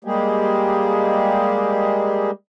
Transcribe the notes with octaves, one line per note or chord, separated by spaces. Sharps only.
G3 G#3 A#3 G4 G#4